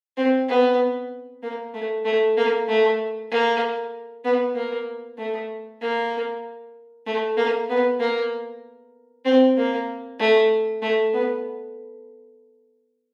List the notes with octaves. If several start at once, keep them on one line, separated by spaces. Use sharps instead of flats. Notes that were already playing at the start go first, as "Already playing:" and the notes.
C4
B3
A#3
A3
A3
A#3
A3
A#3
B3
A#3
A3
A#3
A3
A#3
B3
A#3
C4
A#3
A3
A3
B3